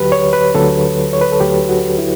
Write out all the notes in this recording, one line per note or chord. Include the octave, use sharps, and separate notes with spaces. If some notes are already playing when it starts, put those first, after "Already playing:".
Already playing: D2 D3 F#3 G4 B4
C#5
B4
D2 D3 F#3 A4
C#5
B4
A4
D2 D3 F#3 G4
F#4
E4